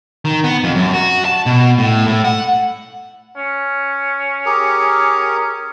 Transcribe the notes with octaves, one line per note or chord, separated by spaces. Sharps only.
D#3
B3
F2
F#2
F#4
A5
B2
A2
A2
F#5
C#4
G4 G#4 A#4